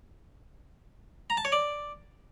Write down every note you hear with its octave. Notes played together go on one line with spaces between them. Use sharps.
A#5
A5
C#5
D5